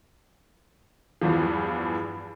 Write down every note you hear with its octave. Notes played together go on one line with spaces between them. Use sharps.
E2 G2 E3 F3